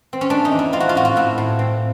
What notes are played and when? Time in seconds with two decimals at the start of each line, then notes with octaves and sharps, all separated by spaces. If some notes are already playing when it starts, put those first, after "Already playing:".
0.13 C4
0.21 C#4
0.30 A3 D4
0.45 D#4
0.51 E2
0.59 E4
0.73 C4 F4
0.80 F#4
0.89 F4
0.95 A2 F#4
1.05 F4
1.16 A2 E4
1.38 A2
1.59 C4